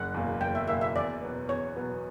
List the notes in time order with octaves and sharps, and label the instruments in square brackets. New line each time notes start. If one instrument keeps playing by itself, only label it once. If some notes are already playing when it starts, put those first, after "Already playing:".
Already playing: [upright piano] F#1 [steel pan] F#5
[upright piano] E2 B2 A#3
[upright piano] F#1 [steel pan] G5
[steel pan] E5
[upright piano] E2 B2 A#3 [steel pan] E5
[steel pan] E5
[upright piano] E2 [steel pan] D5
[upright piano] B2 F#3 B3
[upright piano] E2 [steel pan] C#5
[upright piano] B2 F#3 B3